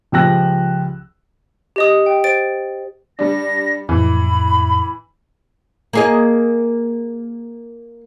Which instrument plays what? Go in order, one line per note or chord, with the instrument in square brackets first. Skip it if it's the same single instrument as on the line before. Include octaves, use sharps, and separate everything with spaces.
[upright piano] C#2 F3 G4 E6 F#6 A#6
[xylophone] G4 D#5 D#6
G5
C5 A6 D7
[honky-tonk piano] G3 D4 [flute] A#6
[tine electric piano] F2 A2 [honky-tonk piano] E3 [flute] B5
[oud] A#3 G#4 D#5